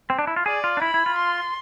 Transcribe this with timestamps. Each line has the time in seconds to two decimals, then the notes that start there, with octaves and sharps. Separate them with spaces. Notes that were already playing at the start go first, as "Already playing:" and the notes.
0.10 C4
0.19 D4
0.27 E4
0.36 F4
0.46 G#4 D5
0.64 F4
0.77 D4
0.82 E4 B5
0.94 E4
1.06 F4
1.18 C6